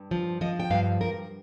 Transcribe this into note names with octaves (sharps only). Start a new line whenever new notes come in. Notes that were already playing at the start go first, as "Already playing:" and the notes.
Already playing: G2
F3
F3 D#5
G5
G2 F5
G2 A#4